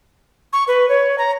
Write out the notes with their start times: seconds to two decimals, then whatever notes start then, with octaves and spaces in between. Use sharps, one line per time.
0.53 C#6
0.68 B4
0.89 C#5
1.18 A#5